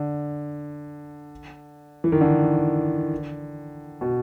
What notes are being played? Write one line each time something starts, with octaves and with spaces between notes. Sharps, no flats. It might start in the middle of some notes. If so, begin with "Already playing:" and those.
Already playing: D3
E3
D#3
D3
B2